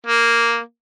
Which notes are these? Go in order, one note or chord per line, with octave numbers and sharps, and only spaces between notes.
A#3